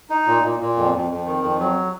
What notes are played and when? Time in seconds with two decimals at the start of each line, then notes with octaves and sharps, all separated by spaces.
0.10 D#4
0.26 A#2
0.43 A#2
0.60 A#2
0.76 F2
0.92 F2
1.10 F2
1.26 D#3
1.42 F2
1.59 F#3